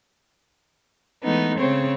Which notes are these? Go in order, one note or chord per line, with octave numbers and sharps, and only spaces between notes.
E3 G#3 A3 B3 D#4
C#3 C4 C#5